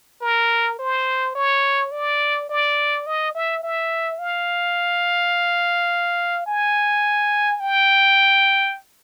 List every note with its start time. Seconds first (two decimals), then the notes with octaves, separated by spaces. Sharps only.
0.22 A#4
0.79 C5
1.35 C#5
1.92 D5
2.49 D5
3.06 D#5
3.35 E5
3.63 E5
4.19 F5
6.46 G#5
7.60 G5